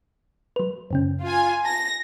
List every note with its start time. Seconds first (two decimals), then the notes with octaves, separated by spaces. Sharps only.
0.56 F#3 B4
0.91 F#2 C#3 C#4
1.22 F4 G#5
1.65 A5 A#6